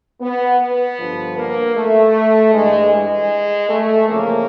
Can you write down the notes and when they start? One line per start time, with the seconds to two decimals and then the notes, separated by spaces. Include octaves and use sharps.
0.21 B3
0.59 B3
0.98 G2 D3 F3
1.37 A#3
1.76 A3
2.53 G2 E3 G#3
2.91 G#3
3.69 A3
4.08 F2 C#3 E3 A#3